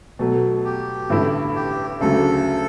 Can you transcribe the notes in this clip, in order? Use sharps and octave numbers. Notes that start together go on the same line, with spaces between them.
B2 F#3 A3
G4
A1 G2 D3 A3 E4
G4
D2 C#3 F#3 A3 A4